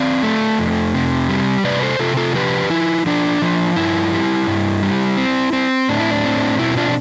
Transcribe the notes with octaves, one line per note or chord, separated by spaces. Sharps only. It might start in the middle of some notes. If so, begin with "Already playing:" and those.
Already playing: C4 D5 F5
A3
F2
C3
G3
C3 B4 D5
A4 C5
C3 F4 A4
F4 A4
F3 G4 B4
F3 E4
F3 D4
F3
G2 E4
G3
G2
G3
C4
C4
A2 D4
E4
D4
C4
B2 E4
D4 F4